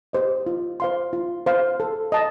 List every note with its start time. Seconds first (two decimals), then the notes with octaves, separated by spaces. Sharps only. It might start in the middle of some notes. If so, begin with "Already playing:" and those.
0.13 G4 C5 D#5
0.46 F4
0.80 C5 F5 C6
1.13 F4
1.46 C5 F5 C6
1.80 A4
2.12 D#5 A5